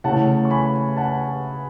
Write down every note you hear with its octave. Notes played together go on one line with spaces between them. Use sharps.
C#3 E3 A3 F#5 A5
C#6
G#5 B5
F#5 A5